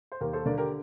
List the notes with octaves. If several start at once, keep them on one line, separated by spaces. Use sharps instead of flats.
C5
D#2 G4 A#4
A4 C5
D3 A#4 D5
G4 A#4